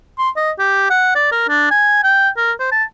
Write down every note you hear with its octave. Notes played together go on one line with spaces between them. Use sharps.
C6
D#5
G4
F#5
D5
A#4
D4
G#5
G5
A#4
C5
A5